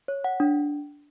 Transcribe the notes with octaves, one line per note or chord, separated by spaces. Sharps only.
C#5
F#5
D4